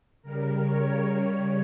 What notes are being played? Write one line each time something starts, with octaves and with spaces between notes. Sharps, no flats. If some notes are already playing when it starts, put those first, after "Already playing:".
C#3 G3 A#4
C#5
C#3 G3 C#5